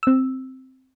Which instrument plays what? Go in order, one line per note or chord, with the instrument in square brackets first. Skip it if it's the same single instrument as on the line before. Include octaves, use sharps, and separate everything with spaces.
[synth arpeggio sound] C4 E6